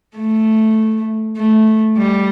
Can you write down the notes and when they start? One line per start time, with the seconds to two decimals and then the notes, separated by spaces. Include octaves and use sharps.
0.17 A3
1.37 A3
1.98 G3